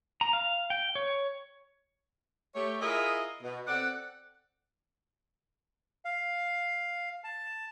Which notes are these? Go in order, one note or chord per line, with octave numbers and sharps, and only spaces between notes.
A#5
F5
G5
C#5
A3 G4 C#5
E4 F4 G#4 A#4 D#5 E5
B2
C4 A4 D5 F#5
F5
A5